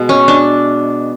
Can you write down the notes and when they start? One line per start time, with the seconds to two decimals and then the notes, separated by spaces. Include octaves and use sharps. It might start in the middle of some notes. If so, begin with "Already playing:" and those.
Already playing: B2 G#3 B3
0.09 C#4
0.28 D4